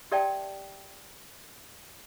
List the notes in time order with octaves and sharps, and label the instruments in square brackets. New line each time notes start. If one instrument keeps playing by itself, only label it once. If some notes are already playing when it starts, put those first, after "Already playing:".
[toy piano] G4 A#4 D5 E5 G5 A5